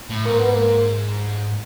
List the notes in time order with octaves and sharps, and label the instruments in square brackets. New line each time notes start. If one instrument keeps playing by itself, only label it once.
[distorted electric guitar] A2
[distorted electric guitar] G#2 [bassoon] A#3
[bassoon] B3
A#3